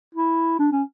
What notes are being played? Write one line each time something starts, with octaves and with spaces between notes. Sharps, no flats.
E4
D4
C#4